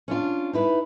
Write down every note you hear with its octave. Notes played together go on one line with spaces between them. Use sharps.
C#4 D4 F4
D#4 E4 B4